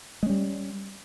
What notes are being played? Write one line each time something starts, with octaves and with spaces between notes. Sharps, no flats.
G3 G#3 C#4